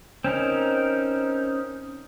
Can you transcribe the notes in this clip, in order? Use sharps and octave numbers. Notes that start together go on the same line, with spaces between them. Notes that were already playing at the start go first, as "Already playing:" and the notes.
C4 C#4 D#4 A#4